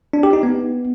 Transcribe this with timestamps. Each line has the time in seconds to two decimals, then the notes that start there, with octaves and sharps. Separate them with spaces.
0.13 D4
0.23 G4
0.33 D#4
0.43 B3